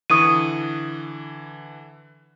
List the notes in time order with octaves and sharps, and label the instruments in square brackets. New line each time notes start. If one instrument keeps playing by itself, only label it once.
[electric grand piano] D3 E3 C#6 [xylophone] D#6 D#7